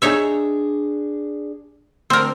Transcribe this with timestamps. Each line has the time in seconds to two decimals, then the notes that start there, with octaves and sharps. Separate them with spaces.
0.02 D4 D#4 G#4 C#5 E5
2.10 D2 C4 A#4